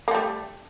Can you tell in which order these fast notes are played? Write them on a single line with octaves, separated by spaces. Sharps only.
A#3 A3 G3